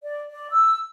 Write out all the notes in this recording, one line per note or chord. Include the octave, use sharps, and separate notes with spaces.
D5
D5
E6